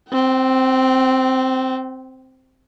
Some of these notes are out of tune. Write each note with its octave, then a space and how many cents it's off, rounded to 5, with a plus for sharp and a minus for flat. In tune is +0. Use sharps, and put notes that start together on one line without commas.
C4 +0 G5 -35